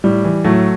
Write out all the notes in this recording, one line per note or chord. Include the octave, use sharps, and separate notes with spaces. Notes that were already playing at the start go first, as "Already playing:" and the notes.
A2 G3
E3
A2 F#3 A3